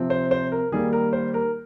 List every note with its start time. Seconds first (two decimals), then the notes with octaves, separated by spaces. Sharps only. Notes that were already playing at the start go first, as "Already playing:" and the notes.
Already playing: C3 F3 C4
0.10 C5
0.31 C5
0.52 A#4
0.72 D#3 G3 A#3 G#4
0.93 A#4
1.13 C5
1.34 A#4